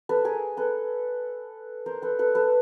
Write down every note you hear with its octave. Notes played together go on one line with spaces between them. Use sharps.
A4 B4
G#4 A#4
A4 B4
A#4 C5
A4 B4
A4 B4
A4 B4